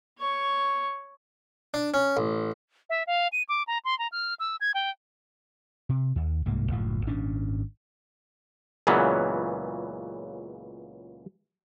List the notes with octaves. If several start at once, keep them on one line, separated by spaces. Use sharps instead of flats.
C#5 C#6
D4
C#4
A1
E5
F5
D#7
D6
A#5
C6
A#5
F6
E6
G#6
G5
C3
D#2
D1 C2 G#2 A#3
F#1 D2 A2 F3
G#1 A#2 C#4 D4
C#2 A#2 C#3 E3 F#3 B3